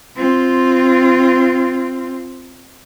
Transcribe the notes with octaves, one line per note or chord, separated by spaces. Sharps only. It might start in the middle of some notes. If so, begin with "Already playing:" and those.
C4 F4